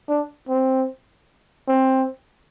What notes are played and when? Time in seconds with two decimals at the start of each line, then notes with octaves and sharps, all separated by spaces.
0.09 D4
0.48 C4
1.68 C4